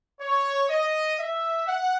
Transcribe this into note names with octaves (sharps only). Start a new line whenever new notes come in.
C#5
D#5
E5
F#5